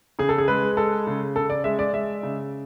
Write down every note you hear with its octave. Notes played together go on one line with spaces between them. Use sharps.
C#3 G#4
A4
G#4
G#3 B4
G#3 A4
C#3
C#3 A4
D5
G#3 E5
D5
G#3 E5
C#3